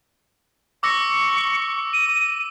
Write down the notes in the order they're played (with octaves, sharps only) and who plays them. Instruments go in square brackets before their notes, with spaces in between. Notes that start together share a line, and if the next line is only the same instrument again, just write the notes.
[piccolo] C#6 [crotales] D6 E6 A#6
[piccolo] D#7